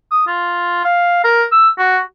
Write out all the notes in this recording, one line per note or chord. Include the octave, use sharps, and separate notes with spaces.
D#6
F4
F5
A#4
E6
F#4